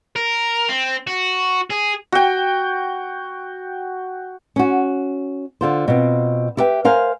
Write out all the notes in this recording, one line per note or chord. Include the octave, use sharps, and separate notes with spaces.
A#4
C4
F#4
G#4
F#4 G5
C#4 F#4
D3 F4 C5
B2 C4 F4
E4 G4 B4 E5 G5
A#4 C5 F5 G#5